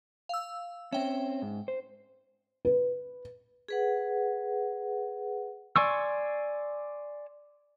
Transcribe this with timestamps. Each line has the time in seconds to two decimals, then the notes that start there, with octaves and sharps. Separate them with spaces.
0.29 F5 E6
0.92 C4 C#4 E5 G5
1.42 G#2
1.68 C5
2.65 B4
3.68 G#4 B4 F#5
5.76 D5 G#5 C6 C#6 E6